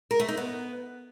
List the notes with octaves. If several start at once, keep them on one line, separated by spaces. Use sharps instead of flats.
A#4
A3
D#4
B3